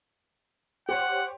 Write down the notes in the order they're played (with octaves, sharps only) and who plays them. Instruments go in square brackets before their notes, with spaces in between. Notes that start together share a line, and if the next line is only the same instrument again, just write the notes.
[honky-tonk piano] G4 C5 C#5 [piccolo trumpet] F#5